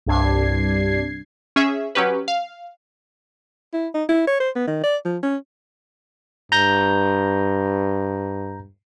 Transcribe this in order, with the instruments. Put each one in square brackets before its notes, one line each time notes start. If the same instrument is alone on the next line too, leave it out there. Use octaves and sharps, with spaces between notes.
[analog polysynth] C2 G2 D4 G#6 C7
[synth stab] C#4 G#4 E5
F#3 C#4 G4 B4
F5
[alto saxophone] E4
D#4
E4
C#5
C5
B3
D#3
D5
F3
C#4
[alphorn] G2 [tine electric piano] A#5 G6 A#6